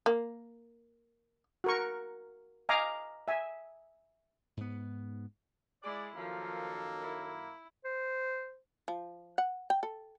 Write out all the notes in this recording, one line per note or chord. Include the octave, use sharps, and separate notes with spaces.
A#3
F#4 A#4 C#6
D#5 F5 G#5 A#5 D6
E5 G#5
G#2 B3
G#3 E4 D5
F#2 D#3 F3 A#3 A4
E4
C5
F3
F#5
G5
A4